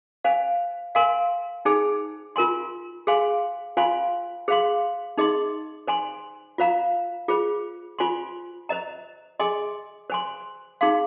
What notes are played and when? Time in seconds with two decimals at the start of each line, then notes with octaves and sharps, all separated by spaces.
0.24 C5 F5 G#5
0.95 A#4 F5 G#5 C6
1.65 D#4 G#4 C5 G#5
2.36 F4 A#4 G#5 C6
3.07 G#4 C5 F5 G#5 C6
3.77 F4 C5 F5 G#5 C6
4.48 G#4 C5 F5 C6
5.18 D#4 G#4 D#5 C6
5.88 C5 G#5 C6
6.58 F4 C5 F5 A#5
7.28 F4 G#4 C5
7.99 F4 C5 G#5 C6
8.69 C5 D#5 A#5
9.40 G#4 D#5 G#5 C6
10.10 C5 G#5 C6
10.81 D#4 G#4 F5 C6